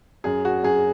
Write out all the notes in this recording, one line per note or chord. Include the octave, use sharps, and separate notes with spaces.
F#2 G#4
F#4
F#2 G#4